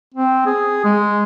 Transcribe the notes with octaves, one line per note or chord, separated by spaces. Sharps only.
C4
G#4
G#3